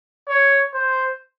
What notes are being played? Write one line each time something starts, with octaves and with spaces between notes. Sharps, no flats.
C#5
C5